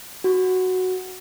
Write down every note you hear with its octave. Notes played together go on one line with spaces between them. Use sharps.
F#4